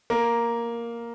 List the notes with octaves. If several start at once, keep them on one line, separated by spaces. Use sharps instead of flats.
A#3